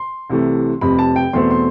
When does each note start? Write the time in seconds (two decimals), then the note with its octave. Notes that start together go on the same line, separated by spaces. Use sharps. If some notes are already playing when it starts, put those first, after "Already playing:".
Already playing: C6
0.30 C2 C3 E3 A3
0.81 F1 F2 C3 B5
0.99 A5
1.16 G5
1.33 E2 B2 A3 C4 C6
1.51 C6